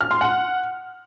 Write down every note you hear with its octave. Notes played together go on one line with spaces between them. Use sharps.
F6
C6
F#5